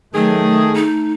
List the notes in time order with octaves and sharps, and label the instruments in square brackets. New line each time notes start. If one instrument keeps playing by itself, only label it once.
[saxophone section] D#3 G#4 [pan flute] F#3 [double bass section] A3
[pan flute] D#4